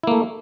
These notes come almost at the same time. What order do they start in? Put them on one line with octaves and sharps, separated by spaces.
E4 A#3 A3